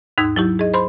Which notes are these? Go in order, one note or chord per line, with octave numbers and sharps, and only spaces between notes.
D#2 G#2 D#4 E6 G#6
F#3 E4 G4
G#4 D#5
C5 B5 C6